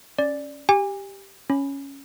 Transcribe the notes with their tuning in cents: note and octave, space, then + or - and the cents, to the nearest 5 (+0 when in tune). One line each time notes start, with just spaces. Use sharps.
C#4 +0 D5 +0
G4 +0 G#5 -35
C#4 +0 B5 +0